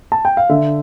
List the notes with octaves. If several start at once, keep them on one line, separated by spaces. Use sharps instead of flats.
A5
G5
F5
D3 E5